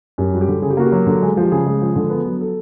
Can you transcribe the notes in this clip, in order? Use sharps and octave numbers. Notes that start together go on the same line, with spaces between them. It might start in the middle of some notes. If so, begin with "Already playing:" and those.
F#2 G4
G3 F#4
G4
D3
C#3 G#4
G4
A#3 F#4
G4
F#3
D3
G#3
F3 G4
C#3 G#4
G#3
F3
D3
B3
F#3
A4